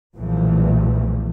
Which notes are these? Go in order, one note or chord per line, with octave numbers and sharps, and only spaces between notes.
B1 E2 A#2 E3 F3 A3